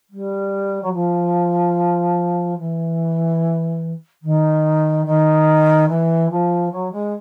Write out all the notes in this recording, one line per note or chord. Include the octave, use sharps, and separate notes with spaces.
G3
F#3
F3
E3
D#3
D#3
E3
F3
F#3
G#3